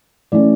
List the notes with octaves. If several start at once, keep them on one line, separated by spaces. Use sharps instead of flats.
E3 A3 C#4 D5